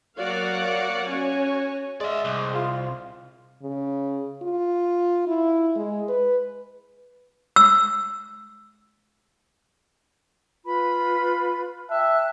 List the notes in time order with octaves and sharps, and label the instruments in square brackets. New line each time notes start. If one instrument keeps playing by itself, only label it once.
[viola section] F#3 A#3 F#4 D5 F5 F#5
C#4 F#4 C#5 G#5
[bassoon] G#3 [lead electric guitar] D5 E5
[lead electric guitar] C2
[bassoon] F4
[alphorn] C#3
F4
E4
G#3
B4
[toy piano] E6
[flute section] F4 B4 B5
[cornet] E5 [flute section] G5 A5 F#6